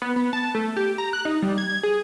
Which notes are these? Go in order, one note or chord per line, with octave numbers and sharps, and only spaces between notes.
B3
B3
A5
A3
G4
A#5
F#6
D#4
G3
G#6
G#4